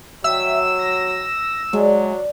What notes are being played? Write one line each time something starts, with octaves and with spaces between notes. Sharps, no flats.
D#3 F#3 E5 G5 E6
A#6
F#3 G#3 D4